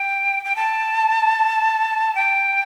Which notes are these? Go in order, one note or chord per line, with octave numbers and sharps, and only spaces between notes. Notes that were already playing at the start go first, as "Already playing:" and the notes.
Already playing: G5
G5
A5
G5